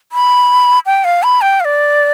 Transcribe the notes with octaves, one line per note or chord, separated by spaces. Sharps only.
B5
G5
F5
B5
G5
F5
D5